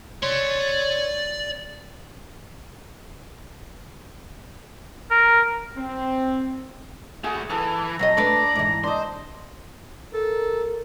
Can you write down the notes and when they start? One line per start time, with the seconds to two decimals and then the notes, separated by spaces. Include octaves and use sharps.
0.23 C#5 D5 C6
5.11 A#4
5.76 C4
7.24 A3 F#4 G#4
7.50 E3 A4
7.99 F#3 C4 D#5 A#5
8.17 A3 D4 B4 D5
8.56 G#2 E3
8.84 D4 C5 D#5
10.13 A4 A#4